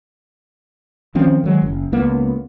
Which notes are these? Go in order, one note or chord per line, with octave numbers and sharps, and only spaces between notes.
D#3 F3 C4 C#4
D#3 F#3 G#3
F#1
C#2 A#3 B3